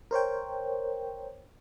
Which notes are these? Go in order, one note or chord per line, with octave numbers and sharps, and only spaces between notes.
A#4 C5 C#5 G5